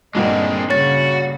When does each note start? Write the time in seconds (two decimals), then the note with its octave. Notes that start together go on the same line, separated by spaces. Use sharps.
0.15 G2 A#2 D3 G#3 C4 D#4
0.70 C#3 F#4 C#5 A6